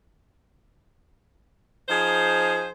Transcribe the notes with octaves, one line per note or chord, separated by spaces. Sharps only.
F3 D#4 G#4 C5